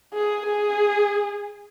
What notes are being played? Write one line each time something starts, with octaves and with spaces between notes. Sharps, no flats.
G#4
G#4